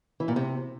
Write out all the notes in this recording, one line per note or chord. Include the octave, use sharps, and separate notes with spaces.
E3
A#2
C3